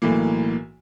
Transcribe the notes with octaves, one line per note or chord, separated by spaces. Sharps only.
B1 A2 E3 A#3